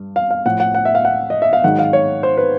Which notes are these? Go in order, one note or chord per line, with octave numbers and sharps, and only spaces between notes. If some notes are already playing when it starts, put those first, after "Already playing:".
Already playing: G2
F5
F5
A2 F3 F#5
F#5
F#5
E5
F5
F#5
D#5
E5
F5
G#2 D#3 F#3 F#5
F5
C#5
C5
B4